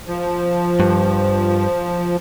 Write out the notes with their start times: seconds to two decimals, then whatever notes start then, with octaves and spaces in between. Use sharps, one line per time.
0.08 F3
0.80 G2